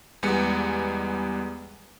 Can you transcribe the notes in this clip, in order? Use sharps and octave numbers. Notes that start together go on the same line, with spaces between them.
E2 G3 G#3 B3 C#7